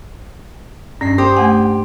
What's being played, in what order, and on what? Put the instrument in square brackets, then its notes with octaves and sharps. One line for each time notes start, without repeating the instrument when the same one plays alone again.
[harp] G2 B6 C7 [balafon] C#4
[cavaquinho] G4 C5 D#6
[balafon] A3 F#5 G#5